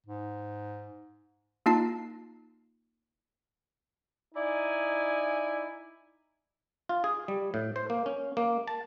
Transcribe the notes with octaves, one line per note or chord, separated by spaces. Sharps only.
G#2
A#3 D#4 F4 A5 C7
D#4 E4 D5 G#5
F4
G#4
G3
A2
C5
A#3
C#4
A#3
A5